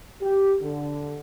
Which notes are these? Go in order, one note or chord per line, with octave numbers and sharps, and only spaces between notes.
G4
D3